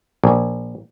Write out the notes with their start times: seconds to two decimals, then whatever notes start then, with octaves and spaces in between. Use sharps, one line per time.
0.24 A#1